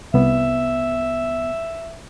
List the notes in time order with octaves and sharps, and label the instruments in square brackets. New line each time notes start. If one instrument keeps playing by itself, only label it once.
[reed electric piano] C2 B3 [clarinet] E5